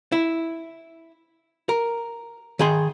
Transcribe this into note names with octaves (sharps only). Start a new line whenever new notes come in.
E4
A#4
D#3 G#4 C6